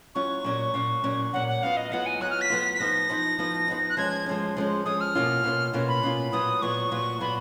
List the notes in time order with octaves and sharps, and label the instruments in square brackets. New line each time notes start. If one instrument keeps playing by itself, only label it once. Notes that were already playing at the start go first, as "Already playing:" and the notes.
[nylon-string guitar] F#3 C#4 F4 [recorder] C#6
[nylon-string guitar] A#2 F#3 C#4
A#2 F#3 C#4
A#2 F#3 C#4
[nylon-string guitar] A#2 F#3 C#4 [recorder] F#5
[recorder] F#5
[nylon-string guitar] F#3 B3 F4 [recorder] F5
[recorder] D#5
[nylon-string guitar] F#3 B3 F4 [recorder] F#5
[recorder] G#5
[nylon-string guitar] F#3 B3 F4 [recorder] F#6
[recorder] F6
B6
[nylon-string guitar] F#3 B3 F4
[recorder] B6
[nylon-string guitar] F3 B3 D#4 [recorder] A#6
[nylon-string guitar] F3 B3 D#4
F3 B3 D#4
F3 B3 D#4
[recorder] F#6
[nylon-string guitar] F3 G#3 C#4 [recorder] G#6
[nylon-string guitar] F3 G#3 C#4
F3 G#3 C#4
[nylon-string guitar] F3 G#3 C#4 [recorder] D#6
[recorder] F6
[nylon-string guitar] B2 A#3 C#4 F4
B2 A#3 C#4 F4
B2 A#3 C#4 F4
[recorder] B5
[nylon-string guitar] B2 A#3 C#4 F4
[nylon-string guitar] A#2 F#3 B3 F4 [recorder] D#6
[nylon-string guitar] A#2 F#3 B3 F4 [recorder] C#6
[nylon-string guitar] A#2 F#3 B3 F4
[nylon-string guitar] A#2 F#3 B3 F4 [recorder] B5